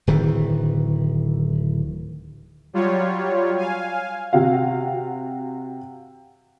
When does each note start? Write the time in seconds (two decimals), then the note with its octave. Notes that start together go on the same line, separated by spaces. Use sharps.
0.07 D1 D#3 E3
2.73 F#3 G3 F4 C#5
3.57 F5 G#5
4.33 C3 F#4 F5